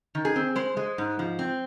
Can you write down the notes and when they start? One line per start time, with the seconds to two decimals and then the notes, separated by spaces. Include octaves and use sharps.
0.15 D#3
0.25 G#4
0.36 C4
0.56 G#3 C5
0.77 G#3
0.98 G#2
1.19 F3
1.39 C4